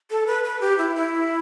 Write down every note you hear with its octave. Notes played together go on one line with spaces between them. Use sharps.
A4
B4
B4
G4
E4
E4